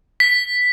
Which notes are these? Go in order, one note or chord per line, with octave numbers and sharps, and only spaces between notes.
B6